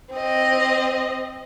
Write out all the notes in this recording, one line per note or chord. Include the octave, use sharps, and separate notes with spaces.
C4 D#5